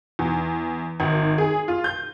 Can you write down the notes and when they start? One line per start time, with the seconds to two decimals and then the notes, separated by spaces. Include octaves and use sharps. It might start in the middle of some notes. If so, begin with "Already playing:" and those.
0.19 E2
1.00 G#1
1.38 G#4
1.68 F4
1.84 G6